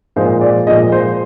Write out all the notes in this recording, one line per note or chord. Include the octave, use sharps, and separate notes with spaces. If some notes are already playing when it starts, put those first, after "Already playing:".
A#2 F3 G#3 C5
D5
A#2 F3 G#3 D#5
C5